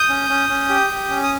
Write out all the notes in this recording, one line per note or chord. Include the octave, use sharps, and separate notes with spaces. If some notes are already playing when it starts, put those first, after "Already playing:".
Already playing: D#6 G6
C#4
C#4
C#4
G4
G4
C#4
D#6